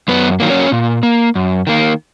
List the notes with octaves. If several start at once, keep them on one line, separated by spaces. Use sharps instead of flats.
F#2 B3 B4
D#3 F#3 A#3
C#4 C#5
A#2
A#3
F#2
D#3 A#3